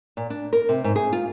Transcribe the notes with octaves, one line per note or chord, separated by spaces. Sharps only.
A#2
D4
A#4
C3
G#2
G#4
F4